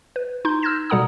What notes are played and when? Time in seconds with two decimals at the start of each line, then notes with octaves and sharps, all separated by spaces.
0.16 B4
0.45 D#4 C6 G6
0.62 E6 F6 G6 G#6 A#6 E7
0.90 B2 G3 A4 F#5 A#5 D#6